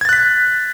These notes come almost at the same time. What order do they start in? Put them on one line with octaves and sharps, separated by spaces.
G#6 A6 F#6 B6